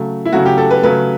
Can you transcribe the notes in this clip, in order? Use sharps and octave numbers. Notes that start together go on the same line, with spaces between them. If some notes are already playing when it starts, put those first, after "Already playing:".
Already playing: C#3 F#3 A3
E4
C#3 F#3 A3 F#4
G4
A4
B4
C#3 F#3 A3 B4